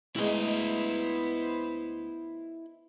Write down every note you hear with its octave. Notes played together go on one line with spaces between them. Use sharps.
D2 G#3 B3 E4 C5 D#5